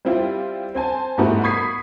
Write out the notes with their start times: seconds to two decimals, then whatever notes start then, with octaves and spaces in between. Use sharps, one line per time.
0.05 G3 C4 E4 F4 G4
0.75 C4 C5 G#5 A5
1.18 G#2 G3 A3 B3 E4 F#4
1.43 B5 C#6 D#6 G#6 B6 C7